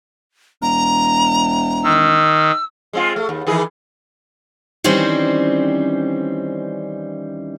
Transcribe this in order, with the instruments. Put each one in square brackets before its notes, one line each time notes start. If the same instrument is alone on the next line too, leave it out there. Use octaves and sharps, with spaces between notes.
[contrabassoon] E1 [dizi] A#5
[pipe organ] D#3 [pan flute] E6
[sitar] G#3 C4 F4
A3
D#2
D#3 E3 G#4
[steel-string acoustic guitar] D#3 E3 G3 C4 C#4 C5